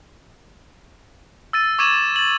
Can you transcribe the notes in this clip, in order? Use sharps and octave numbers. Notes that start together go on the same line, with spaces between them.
E6 A6 D#7
C#6 D6 G#6 D#7 E7 F#7
A6 F#7